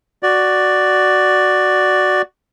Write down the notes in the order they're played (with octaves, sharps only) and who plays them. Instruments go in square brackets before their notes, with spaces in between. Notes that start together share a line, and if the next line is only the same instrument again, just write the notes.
[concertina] F#4 D5